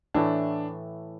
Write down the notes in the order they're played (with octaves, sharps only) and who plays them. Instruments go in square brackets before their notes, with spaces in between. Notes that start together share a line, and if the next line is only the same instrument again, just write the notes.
[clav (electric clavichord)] A2 E3 A3 [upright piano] D4